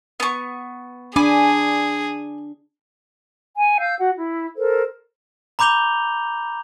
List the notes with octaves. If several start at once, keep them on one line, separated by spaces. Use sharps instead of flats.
B3 C#6
D4 G#4 G#5 B5 D6
G#5
F5 E6 G6
F#4 F#5
E4
A4 A#4 C5
A#5 B5 D6 G6 F7 G7